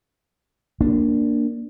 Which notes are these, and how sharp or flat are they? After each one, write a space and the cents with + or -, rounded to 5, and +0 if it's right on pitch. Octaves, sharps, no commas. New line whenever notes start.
A#3 +0 D4 +0